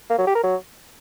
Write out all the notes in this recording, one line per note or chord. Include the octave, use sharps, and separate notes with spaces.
A#3
F#3
G4
A#4
F#3